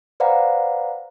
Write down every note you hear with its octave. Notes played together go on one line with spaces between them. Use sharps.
B4 C5 D5 F5 F#5 A#5